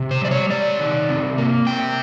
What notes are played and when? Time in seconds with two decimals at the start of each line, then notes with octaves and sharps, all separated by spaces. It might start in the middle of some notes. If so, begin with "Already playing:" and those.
Already playing: C3
0.11 C5
0.21 G3 D5
0.31 C#5
0.50 C3 D5
0.80 D#3
1.09 C3
1.38 A#3
1.67 C3 G5